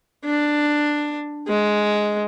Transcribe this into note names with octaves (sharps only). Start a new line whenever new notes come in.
D4
G#3